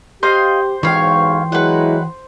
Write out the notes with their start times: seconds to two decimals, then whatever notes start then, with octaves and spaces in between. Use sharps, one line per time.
0.23 G4 C5 D#5 F5
0.83 B1 G#2 E3 G4 C#5 F5
1.52 F#3 G#3 E4 B4 F#5